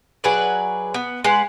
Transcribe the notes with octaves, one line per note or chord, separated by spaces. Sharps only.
F#3 G#4 B4 D5
B3
G#3 B4 F#5